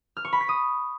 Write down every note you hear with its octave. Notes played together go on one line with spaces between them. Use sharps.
F6
C#6
B5
B6
D#6